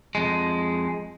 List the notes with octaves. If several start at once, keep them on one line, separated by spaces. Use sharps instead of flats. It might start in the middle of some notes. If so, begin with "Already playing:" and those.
F2 G#3